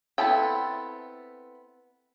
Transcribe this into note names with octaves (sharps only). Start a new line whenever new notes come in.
B3 C4 E4 A4 G5